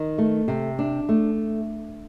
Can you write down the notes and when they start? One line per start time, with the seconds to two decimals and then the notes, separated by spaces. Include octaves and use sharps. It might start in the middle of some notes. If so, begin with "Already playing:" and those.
Already playing: D#3
0.18 A3
0.48 C3
0.79 D4
1.09 A3